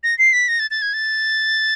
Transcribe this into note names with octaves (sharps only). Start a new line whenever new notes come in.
A#6
C7
B6
A#6
A6
A6
G#6
A6